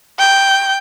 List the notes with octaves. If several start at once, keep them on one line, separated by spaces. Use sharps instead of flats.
G5